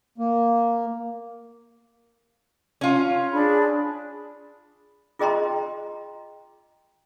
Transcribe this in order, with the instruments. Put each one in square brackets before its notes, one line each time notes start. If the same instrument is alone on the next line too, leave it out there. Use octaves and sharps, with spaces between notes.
[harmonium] A#3
[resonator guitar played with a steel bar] C#4 F4
[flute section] D4 G#4 B5
[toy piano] F4 G#4 D#5 G5 A#5 C6